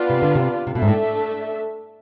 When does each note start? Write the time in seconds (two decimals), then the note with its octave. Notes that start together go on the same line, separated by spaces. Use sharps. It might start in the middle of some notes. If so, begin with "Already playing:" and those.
Already playing: B3 D4 F4 B4 D5
0.10 C3
0.22 D3
0.35 C3
0.67 C3
0.75 B2 A3 D4 A4 E5
0.82 G#2
0.88 A2